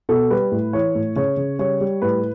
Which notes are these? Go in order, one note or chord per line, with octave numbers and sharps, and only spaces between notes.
B2 A4
G3 B4
A2
E3 C#5
A2
C#3 C#5
C#3
G3 C#5
G3
A2 B4